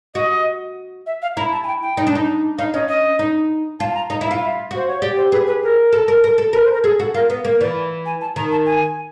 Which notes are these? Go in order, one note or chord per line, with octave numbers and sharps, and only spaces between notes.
F#4 D#5
E5
F5
E4 A#5
A5
G#5
G5
G5
D#4
D4
D#4
D#4 F5
C#4 D#5
D#5
D#4
F4 A5
A5
A#5
D#4 A#5
E4
E5
F4
E5
F#4 C5
C#5
G4 D5
C5
G#4 B4
B4
A#4
A4
A#4
A#4
A4
A#4 B4
C5
A#4
G#4 A4
F#4 A4
F4 A#4
B3
A#3
E3 D5
G#5
A5
D#3 A#5
A5
G#5